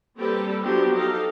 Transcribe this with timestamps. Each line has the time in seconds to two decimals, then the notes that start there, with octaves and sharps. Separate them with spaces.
0.17 G3 A#3 C4 G4 A4 B4
0.62 F3 F#3 B3 D4 G4
0.94 D#4 G4 A4 F5